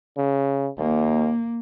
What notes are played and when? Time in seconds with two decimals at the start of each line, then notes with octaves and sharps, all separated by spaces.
0.17 C#3
0.78 D#2 A#3